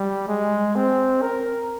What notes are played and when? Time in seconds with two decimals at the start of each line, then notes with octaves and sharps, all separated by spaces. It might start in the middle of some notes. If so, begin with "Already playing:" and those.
Already playing: G3
0.27 G#3
0.75 C4
1.22 A#4